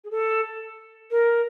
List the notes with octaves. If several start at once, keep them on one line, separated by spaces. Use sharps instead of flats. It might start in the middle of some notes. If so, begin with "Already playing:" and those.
G#4
A4
A#4